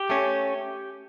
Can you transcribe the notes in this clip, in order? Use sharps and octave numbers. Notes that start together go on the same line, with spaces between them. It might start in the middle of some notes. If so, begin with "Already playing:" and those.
Already playing: G4
A3 C#4